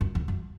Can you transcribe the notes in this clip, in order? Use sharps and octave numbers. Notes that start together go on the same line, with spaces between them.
F#2
E2
F#2